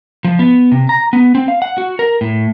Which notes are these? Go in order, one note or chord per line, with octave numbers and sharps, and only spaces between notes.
F3
B3
C3
A#5
B3
C4
F5
F#5
F#4
A#4
A2